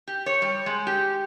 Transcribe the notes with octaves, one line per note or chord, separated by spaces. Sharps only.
G4
C#5
G3
G#3
G4